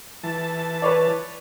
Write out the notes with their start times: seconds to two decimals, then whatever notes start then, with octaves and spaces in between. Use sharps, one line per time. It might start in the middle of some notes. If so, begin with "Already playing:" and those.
0.24 E3 A5
0.82 B4 C#5 D5